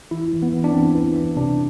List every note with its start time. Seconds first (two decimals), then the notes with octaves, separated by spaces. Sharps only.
0.11 E3 E4
0.33 E3
0.42 B3
0.54 E3
0.64 D4
0.74 E3 C4
0.94 E3
1.16 E3
1.37 C3 D4